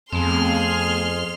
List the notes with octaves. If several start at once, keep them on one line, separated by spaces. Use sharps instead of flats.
F2 A3 B3 C4 G#4 C6 F6